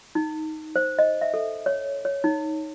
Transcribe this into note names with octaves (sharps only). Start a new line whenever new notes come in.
D#4
C5
D#5
E5
A4
C#5
C#5
D#4